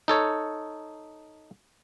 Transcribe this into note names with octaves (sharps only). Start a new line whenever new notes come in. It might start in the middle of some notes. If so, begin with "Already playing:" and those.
D#4 A4 C#5